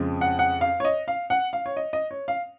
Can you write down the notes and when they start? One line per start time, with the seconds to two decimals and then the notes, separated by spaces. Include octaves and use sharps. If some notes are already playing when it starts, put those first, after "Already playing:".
Already playing: F2 C#3 F3 G#3
0.21 F#5
0.39 F#5
0.61 F5
0.80 C#5
0.85 D#5
1.08 F5
1.30 F#5
1.53 F5
1.66 C#5
1.77 D#5
1.93 D#5
2.11 C#5
2.28 F5